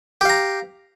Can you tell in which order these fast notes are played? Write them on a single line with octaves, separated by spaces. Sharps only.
G4 F5 A#5